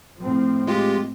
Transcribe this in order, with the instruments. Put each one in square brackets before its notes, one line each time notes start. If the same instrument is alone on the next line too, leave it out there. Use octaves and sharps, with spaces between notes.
[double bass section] A2 F3 C4
[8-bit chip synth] G#3 F4 G4